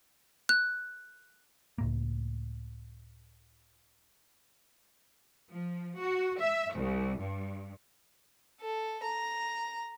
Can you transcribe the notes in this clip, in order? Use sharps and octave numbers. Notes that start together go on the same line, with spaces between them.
F#6
C#2 A2 A#3
F3
F#4
E5
C2
G2
A4
A#5